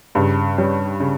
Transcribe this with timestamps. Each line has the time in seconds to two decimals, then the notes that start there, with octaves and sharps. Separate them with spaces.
0.15 G2 C#3
0.58 G3 C#4
1.00 C#3